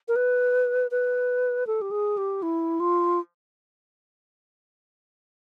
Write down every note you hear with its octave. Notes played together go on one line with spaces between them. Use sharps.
A#4
B4
B4
A4
G4
G#4
G4
E4
F4